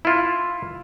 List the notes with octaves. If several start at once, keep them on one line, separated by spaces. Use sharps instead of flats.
E4 F4